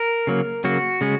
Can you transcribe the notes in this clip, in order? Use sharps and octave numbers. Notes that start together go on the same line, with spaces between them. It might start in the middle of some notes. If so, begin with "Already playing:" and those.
Already playing: A#4
C#3 F#3 A#3
C#3 F#3 A#3 F#4
C#3 G#3 C#4